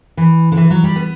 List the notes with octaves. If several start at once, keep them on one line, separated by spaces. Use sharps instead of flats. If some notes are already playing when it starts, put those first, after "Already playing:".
E3
D3
E3
F#3
G3
B3